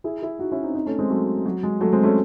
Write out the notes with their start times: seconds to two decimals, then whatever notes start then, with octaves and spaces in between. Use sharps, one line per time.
0.04 E4 G#4
0.22 E4 G#4
0.39 D#4 F#4
0.51 C#4 E4
0.63 C4 D#4
0.75 C4 D#4
0.86 A3 C#4
0.98 G#3 C4
1.10 F#3 A3
1.45 F#3
1.63 G#3
1.80 F#3 A3
1.92 G#3 C4
2.03 A3 C#4